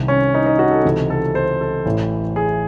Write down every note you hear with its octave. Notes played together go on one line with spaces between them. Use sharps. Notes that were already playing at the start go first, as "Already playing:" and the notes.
Already playing: C2 C3 D#3
C#4
D#4
D#4
F#4
A4
C#2 C3 E3 A4
A4
C5
A4
A1 A2 E3
G#4